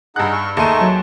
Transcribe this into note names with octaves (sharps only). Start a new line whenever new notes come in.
G2 D#4 G#4 F#5 F#6
C#6
D#2 A3 D#4 G#4 G5 C6 C#6 D#7
F#3